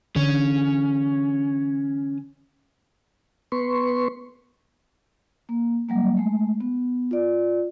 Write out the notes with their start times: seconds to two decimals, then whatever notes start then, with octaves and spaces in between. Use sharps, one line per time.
0.16 D3 E3 C#4
3.52 B3 B4 C6 C#6
5.49 A#3
5.89 F#3 G3 A#3
6.17 G#3 A3
6.60 B3
7.11 F4 D5